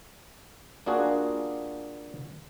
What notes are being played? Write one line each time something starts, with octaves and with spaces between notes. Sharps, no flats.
A#3 D4 F4 F#4 G#4